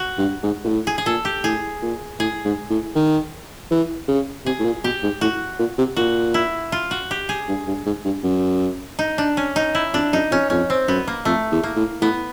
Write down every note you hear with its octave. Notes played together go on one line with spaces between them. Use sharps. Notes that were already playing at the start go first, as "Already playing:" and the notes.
Already playing: F#4
G2
G#2
A#2
A2
G#4
G#4
A#2 A4
G4
A2 G#4
A#2
A2 G#4
G#2
A2
D#3
E3
C#3
C3 G#4
A2
A#2
B2 G4
G#2
A2 F#4
A#2
C3
A#2 F#4
E4
F4
F#4
G4
G#4
G2
G2
G#2
G2
F#2
D#4
D4
C#4
D#4
E4
F2 D4
F#2 D#4
F2 C#4
F2 C#4
C4
F#2 B3
A#3
F2 A3
E2
A#3
A2
A2 B3